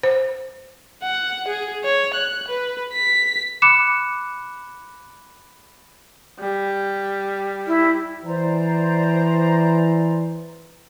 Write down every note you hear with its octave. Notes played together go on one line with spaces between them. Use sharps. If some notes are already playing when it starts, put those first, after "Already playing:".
C5
F#5
G#4
C#5
F#6
B4
B6
B5 D6 F#6 C#7 E7
G3
E4
E3 C5 D5 A#5